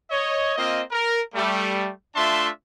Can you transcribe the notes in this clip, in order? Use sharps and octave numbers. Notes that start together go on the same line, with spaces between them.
C#5 D#5
A#3 C4 F4 D#5
A#4
G3 A3
A3 D4 F4 E5 A5 C6